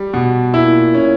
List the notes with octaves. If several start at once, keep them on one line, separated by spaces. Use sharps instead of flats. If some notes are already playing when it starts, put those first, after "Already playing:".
Already playing: G3
B2
A#2 E4
C#4